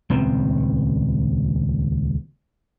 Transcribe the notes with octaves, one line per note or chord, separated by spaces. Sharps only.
D#1 C#2 B3 C4